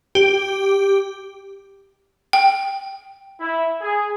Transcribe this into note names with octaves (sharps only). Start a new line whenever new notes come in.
G4
G5
E4
G#4